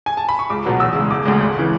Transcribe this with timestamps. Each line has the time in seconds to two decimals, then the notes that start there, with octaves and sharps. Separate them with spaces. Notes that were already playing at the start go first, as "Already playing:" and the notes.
0.06 G#5
0.17 A5
0.29 B5
0.39 C#6
0.50 C#2 D6
0.65 B2 F#3 B3
0.80 E2 E6
0.95 C#3 G#3
1.10 E1 D6
1.26 D2 C#3 G#3
1.41 G#1
1.57 C#3 E3